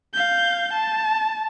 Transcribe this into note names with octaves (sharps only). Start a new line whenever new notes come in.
F5 G6
A5